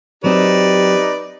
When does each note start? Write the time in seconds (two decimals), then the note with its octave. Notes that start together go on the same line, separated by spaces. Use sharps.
0.24 F#3 C4 D#4 G4 B4 D5